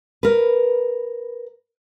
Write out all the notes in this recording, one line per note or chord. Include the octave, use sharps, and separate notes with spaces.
A#4 B4